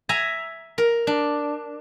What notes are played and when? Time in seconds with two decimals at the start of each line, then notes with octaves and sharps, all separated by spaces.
0.09 E5 G#5 A#5
0.78 A#4
1.07 D4